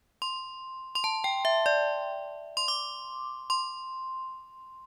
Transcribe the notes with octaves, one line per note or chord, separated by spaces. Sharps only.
C6
C6
A5
G5
E5
D5
C6
D6
C6